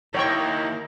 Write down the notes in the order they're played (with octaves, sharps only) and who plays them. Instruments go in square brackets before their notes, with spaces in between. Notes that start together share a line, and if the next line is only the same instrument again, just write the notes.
[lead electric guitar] D#2 [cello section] E4 A#4 [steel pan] C#5 G5 C#6